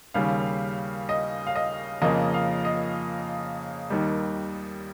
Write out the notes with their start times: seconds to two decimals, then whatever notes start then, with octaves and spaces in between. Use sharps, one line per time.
0.14 D#2 C#3 G3 F5
1.09 D#5
1.47 F5
1.55 D#5
2.02 F2 C#3 F3 A#3 D#5
2.34 F5
2.65 D#5
3.90 D#2 D#3 G3